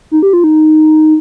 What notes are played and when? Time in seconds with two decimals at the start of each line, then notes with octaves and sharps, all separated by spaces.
0.11 D#4
0.22 G4
0.33 F4
0.44 D#4